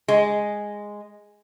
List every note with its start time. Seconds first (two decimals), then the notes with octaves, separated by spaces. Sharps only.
0.08 G#3